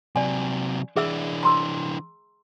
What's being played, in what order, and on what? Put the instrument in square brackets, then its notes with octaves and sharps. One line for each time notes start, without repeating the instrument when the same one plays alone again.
[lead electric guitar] C3 F#3 [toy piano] D5 G#5
[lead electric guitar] E3 D4 [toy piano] G#4 E5 E6
[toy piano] A#5 C6 E6